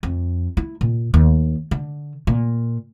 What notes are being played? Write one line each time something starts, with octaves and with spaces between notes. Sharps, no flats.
F2
E4
A#2
D#2
D3
A#2